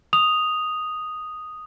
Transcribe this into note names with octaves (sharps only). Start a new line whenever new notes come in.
D#6 F7